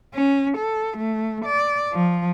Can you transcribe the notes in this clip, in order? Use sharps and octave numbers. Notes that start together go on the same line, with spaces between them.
C#4
A4
A3
D5
F3